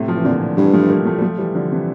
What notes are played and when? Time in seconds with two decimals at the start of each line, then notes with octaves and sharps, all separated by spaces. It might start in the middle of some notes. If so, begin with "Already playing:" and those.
Already playing: A2 C3
0.08 F3
0.16 E3
0.24 F2 A#2 D3
0.57 G2 E3 G3
0.73 F3 A3
0.89 G3 A#3
1.05 F3 A3
1.19 G3
1.22 F3 A3
1.38 E3 G3
1.55 D3 F3
1.71 C3 E3